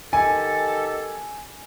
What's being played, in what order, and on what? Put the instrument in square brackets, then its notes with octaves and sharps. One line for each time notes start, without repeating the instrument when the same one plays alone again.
[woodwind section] D#3 G4 A4 [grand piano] G#5